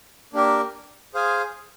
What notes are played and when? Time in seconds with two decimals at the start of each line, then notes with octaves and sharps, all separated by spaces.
0.33 A#3 D4 G4 A#4
1.14 G#4 C5 F5 G#5